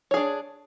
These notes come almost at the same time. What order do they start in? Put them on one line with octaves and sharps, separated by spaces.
C#5 G#4 D4